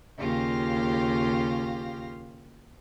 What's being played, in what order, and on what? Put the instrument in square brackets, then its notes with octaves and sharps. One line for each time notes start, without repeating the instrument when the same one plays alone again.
[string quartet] D#2 C#3 F4 G4 F5 A#6